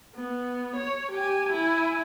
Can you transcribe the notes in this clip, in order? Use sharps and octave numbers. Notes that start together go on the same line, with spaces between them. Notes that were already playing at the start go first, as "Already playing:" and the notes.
B3
C#5
G4 G#5
E4 G#5